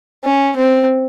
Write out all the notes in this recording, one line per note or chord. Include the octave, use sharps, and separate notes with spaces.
C#4
C4